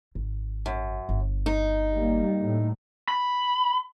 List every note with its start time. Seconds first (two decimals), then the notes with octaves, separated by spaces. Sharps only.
0.15 G#1
0.66 F#2
1.09 G1
1.46 D#4
1.94 G3 A#3
2.42 A2
3.08 B5